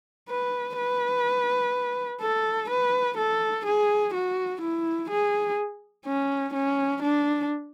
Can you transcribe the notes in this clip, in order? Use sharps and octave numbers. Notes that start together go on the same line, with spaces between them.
B4
B4
A4
B4
A4
G#4
F#4
E4
G#4
C#4
C#4
D4